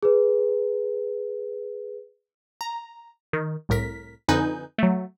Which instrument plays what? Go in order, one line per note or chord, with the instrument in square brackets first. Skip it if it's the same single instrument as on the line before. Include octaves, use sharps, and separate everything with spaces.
[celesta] G#4 B4
[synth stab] A#5
D#3
C2 A2 A#4 B6
F2 D3 D#4 B4 G#5 G6
F#3 A3